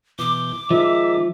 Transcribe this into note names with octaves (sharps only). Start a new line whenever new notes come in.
B2 E3 D6 G6
D#3 F3 G#3 D#4 E5